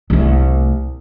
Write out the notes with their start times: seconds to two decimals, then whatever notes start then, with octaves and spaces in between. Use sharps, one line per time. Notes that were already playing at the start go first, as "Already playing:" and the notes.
0.10 C2 A3